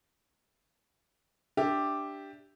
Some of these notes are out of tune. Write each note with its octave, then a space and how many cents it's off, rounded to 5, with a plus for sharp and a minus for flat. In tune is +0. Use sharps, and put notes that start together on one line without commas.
D4 +0 G4 +0 E5 +0